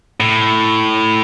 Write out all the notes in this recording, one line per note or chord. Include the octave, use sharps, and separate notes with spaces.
A2